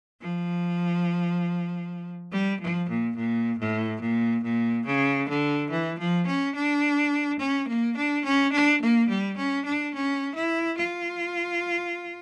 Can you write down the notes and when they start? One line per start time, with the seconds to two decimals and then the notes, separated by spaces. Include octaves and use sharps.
0.21 F3
2.32 G3
2.61 F3
2.89 A#2
3.16 A#2
3.59 A2
4.01 A#2
4.44 A#2
4.86 C#3
5.29 D3
5.71 E3
5.99 F3
6.26 C#4
6.55 D4
7.39 C#4
7.68 A#3
7.97 D4
8.25 C#4
8.53 D4
8.81 A#3
9.09 G3
9.37 C#4
9.65 D4
9.94 C#4
10.35 E4
10.78 F4